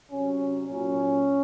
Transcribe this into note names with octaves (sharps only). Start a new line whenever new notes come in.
C3 F#3 C#4
A#2 F#3 C#4